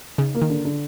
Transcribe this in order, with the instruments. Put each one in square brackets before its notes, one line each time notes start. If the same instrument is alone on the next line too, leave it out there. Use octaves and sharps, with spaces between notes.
[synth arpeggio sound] C#3 [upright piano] D#4
[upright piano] A#3
[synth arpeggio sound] D#3
[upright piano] D3
D3